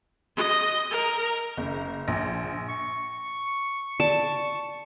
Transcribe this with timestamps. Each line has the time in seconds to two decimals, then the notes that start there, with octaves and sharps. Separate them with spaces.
0.36 D#5
0.91 A#4
1.57 F#1
2.08 A#1
2.68 C#6
4.00 D5 A5